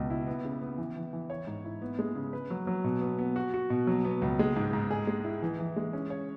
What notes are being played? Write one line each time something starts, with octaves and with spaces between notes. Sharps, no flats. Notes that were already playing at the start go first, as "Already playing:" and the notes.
Already playing: C#2 B2
E4
B3
C#3
B3
E3
E3
E3
C#5
G#2
E4
B3
G#3
C#3
B4
F#3
F#3
B2
B3
B3
F#4
F#4
B2
F#3
B3
C#2
G#3
G#2
G#2
G#4
G#3
E4
E3
E3
G#3
C#4
C#5